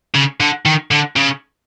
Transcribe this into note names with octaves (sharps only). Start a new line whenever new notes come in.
C#3
D3
D#3
D3
C#3